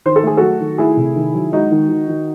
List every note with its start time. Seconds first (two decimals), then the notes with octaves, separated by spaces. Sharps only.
0.06 D#3 C5
0.16 A4
0.23 A3 G#4
0.37 F#3 F#4 A4
0.60 D#3
0.78 A3 E4 G#4
0.97 C3
1.16 D#3
1.34 F#3
1.52 G#3 D#4 F#4
1.71 D#3
1.89 D#3
2.08 D#3